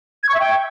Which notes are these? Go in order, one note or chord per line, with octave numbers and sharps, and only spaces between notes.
G#6
C#6
E5
G5